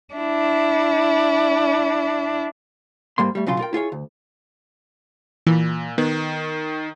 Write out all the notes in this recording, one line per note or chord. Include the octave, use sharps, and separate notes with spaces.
D4 E4
G#2 G3 A#3 C6
G3 A3
B1 C#3 F#3 F4 C6
F4 A#4 G5
E4 F4 G#4 C#5
D2
A#2 E3
D#3 B3